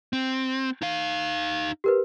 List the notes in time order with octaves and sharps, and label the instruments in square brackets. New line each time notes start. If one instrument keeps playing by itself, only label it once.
[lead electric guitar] C4
D#4 F5
[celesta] G4 A#4 B4